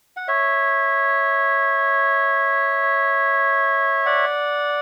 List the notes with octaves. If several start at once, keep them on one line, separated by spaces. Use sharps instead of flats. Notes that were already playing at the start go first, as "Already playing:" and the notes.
F#5
C#5 E5
D5 F#5